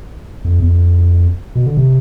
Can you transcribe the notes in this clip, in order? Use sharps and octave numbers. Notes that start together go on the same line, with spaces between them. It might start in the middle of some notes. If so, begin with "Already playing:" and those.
F2
E2
F2
B2
D3
C3